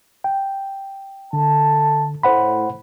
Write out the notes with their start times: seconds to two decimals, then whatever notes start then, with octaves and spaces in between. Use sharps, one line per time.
0.24 G5
1.33 D3 A4 A5
2.23 A2 C5 F#5 B5